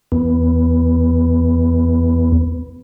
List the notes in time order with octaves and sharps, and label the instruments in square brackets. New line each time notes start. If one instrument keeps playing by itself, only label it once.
[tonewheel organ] E2 B3